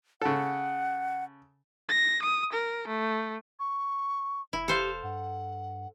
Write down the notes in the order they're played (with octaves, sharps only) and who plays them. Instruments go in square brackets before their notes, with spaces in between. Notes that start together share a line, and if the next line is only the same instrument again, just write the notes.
[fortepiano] C#3 A4 [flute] F#5
[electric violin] A#6
D#6
A#4
A3
[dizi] C#6
[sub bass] F1 [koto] E4
[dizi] G4 [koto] A4 C5 F5
[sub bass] G2 [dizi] F#5